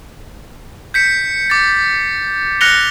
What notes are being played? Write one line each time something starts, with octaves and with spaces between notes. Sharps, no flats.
G6 B6 C#7
D6 A6
F6 F#6 A#6 C#7 F7 G7